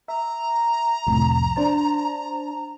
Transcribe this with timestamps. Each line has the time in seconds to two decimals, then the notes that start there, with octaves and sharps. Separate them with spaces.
0.08 E5 A#5
1.07 C2 F2 A2
1.56 D4 C5 A5